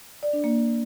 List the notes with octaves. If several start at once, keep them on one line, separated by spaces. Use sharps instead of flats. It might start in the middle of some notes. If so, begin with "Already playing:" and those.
D5
D4
A#3